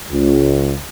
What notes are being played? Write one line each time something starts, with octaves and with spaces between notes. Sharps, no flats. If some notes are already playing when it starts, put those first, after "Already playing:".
C#2